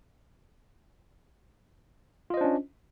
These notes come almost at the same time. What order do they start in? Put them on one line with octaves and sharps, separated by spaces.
F4 D#5 C5 D4 C#4